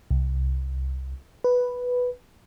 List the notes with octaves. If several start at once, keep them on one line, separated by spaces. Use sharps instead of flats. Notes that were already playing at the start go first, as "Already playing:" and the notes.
C2
B4